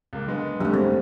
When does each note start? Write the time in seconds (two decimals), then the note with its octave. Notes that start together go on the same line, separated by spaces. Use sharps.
0.13 C#2 A#3
0.27 D3 G#3 B3
0.60 F1 D3 G3 A3 C#4
0.74 G#3 C4